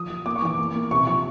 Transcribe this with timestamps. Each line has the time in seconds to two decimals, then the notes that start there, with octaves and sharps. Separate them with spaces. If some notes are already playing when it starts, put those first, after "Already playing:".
Already playing: F3 D#6
0.10 F3
0.26 A#3 D6
0.36 C#6
0.42 E3 D6
0.58 A#3
0.75 A#3
0.91 C3 C#6
1.07 F3 C#6